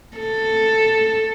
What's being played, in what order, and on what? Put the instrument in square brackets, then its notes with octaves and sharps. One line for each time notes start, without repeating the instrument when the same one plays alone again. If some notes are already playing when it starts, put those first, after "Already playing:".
[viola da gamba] A4